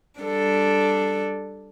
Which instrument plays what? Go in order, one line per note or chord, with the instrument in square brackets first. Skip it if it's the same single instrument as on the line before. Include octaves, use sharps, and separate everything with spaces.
[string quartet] G3 D4 A4